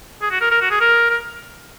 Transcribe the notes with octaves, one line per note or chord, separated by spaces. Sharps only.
G#4
F#4
A#4
A#4
F#4
G#4
A#4
A#4